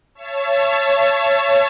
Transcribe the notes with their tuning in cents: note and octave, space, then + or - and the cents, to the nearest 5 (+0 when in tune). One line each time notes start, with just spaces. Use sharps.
C#5 +0 E5 +40 A5 -5